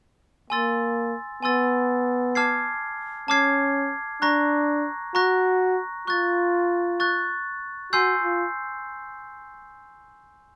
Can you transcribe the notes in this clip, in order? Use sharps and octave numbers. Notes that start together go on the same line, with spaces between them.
A#3 G#5 C6 E6 A6
B3 G#5 C6 E6 A6
A5 D6 F6 G#6 C7
C#4 A5 D6 F6 G#6 C7
D4 A#5 C#6 F#6 A#6
F#4 A#5 C#6 F#6 A#6
F4 C#6 F#6 A6
C#6 F#6 A6
F#4 G#5 C6 E6 G6 C7
F4